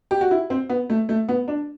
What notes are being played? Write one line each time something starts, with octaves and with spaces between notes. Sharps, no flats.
G4
F#4
E4
C4
B3
A3
A3
B3
D4